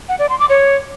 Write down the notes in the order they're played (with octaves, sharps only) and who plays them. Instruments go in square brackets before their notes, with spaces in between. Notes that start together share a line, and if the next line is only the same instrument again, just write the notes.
[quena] F#5
D5
C6
D6
C#5